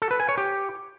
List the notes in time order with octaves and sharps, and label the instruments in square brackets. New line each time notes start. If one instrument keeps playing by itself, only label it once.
[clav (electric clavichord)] A4
B4
G#5
C#5
G4